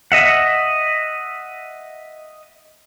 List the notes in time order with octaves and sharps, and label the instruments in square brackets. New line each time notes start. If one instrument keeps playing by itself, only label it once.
[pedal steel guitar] D#5 E5 F#5